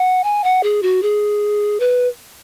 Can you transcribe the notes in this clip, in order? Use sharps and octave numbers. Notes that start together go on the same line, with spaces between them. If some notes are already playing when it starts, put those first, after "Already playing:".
Already playing: F#5
G#5
F#5
G#4
F#4
G#4
B4